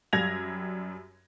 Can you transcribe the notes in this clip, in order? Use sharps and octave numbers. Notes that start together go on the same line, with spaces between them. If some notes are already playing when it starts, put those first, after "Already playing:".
F#2 G3 G#6 A#6 F7